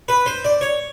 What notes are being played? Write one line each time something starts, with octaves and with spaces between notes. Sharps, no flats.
B4
C5
D5
C#5